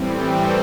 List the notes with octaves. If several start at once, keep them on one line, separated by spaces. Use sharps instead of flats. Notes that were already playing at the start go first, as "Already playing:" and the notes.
Already playing: A2 E3 G3 C4
A4